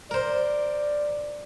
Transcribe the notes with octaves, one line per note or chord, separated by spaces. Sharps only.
A#4 C5 D5